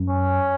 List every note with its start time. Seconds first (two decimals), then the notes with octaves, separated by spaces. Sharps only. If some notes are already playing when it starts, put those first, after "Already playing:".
Already playing: F#2
0.10 C#4